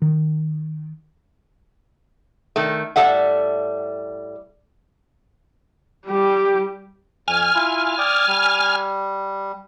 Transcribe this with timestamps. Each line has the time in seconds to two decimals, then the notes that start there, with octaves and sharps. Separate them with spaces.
0.02 D#3
2.56 D#3 A3
2.96 A2 G3 A4 E5 F#5
6.06 G3 G4
7.28 F2 G#5 F6
7.55 E4 F4
7.98 D5 G5 D#6
8.28 G3